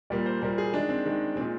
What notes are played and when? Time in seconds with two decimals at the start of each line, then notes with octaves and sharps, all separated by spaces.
0.10 A#2 G3 A#3 D5
0.26 C5
0.42 A#2 G3 A#3 A#4
0.58 G#4
0.73 D#3 G#3 D4
0.89 C4
1.05 D#3 G#3
1.36 G#3 C4
1.40 A#2